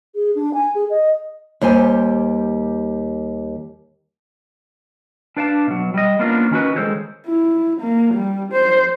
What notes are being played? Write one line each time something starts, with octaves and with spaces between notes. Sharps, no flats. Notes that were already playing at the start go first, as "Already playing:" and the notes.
G#4
D4
G#5
G#4
D#5
D#2 G3 G4 C5 G#5
D4 B4 D5 F5 G#5 A5
B2 F#3
G3 D#5
A#3 B3 C#4 D4 F4 A#4
D#3 C#4 F#4 B4
D#3 G#3 C#4 A4 C5 C#5
E4
A#3
G3
C5